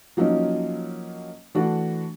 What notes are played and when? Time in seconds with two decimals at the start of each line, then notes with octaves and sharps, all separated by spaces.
0.17 F3 F#3 A#3 C#4 D#4
1.55 E3 A3 D4 F#4